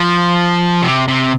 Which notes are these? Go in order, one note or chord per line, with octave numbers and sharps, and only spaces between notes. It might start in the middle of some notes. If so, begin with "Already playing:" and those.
Already playing: F3
C3
C3